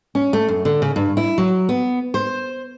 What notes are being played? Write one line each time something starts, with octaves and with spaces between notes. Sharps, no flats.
C#4
A3
F#2
D3
C#3
G2
E4
F#3
B3
C5